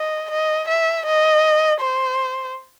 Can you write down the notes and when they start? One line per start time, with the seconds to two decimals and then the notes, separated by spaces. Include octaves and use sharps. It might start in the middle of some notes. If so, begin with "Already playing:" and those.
Already playing: D#5
0.30 D#5
0.68 E5
1.06 D#5
1.81 C5